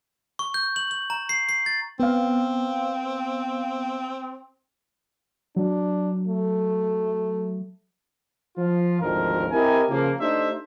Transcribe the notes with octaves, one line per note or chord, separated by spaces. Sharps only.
C#6
G6
F#7
F#7
A#5
C7
C7
A6
B3 C4 F5
F#3 D4
A3
F3 F4
G#1 D2 D#3 F3 A#4
C4 E4 G4 A#4 D#5 G#5
C#3 F3 A#3
A3 D4 D#4 G4 C5 E5